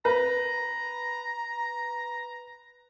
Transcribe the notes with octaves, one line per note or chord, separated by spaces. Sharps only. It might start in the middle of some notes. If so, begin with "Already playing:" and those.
B4 A#5